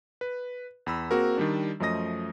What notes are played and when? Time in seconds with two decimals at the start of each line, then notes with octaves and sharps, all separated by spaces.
0.21 B4
0.86 E2 B5 E6
1.11 A#3 C4 F#4 G#4 A#4
1.37 D#3 G3 D4
1.80 F#2 F3 A3 D#5 D#6 A#6